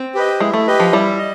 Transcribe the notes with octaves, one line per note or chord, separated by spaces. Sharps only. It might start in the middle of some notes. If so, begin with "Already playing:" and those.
Already playing: C4
G4 B4 D#5
G#3 E4
A3
G4 B4 D#5
F3
G3 E4
D#5